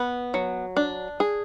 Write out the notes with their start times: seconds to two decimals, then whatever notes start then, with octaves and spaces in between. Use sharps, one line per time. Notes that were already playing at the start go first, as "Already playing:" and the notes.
Already playing: B3
0.34 F#3
0.77 D4
1.20 G#4